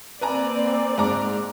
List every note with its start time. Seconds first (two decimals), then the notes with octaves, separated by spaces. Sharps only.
0.21 A#3 C4 B4 D5 G#5 A#5
0.98 G#2 A#5 D6